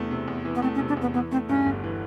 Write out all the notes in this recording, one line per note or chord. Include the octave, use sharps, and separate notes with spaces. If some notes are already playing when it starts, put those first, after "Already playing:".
Already playing: E2 C3 E3 A3
C3
E2
E3
B3
A3 C4
C#4
C3
D4
E2 B3
E3 B3
A3 C4
G2 C#4
G1
E3